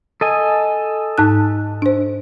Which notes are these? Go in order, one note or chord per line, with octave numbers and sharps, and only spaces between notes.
A4 D#5 G#5
G#2 D#4 F#6
D4 C5